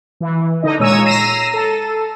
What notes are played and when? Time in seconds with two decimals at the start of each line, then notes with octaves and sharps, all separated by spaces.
0.20 E3
0.63 D3 D#4 D#5
0.79 A#2 G#3 C#5 A#5 E6 D#7
1.05 A#5 E6 A#6 C7 D#7 E7
1.53 A4